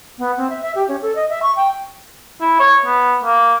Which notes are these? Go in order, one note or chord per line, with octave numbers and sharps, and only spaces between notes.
B3
C4
E5
E5
G4
C#4
A4
D#5
E5
C#6
G5
E4
C#5
B3
A#3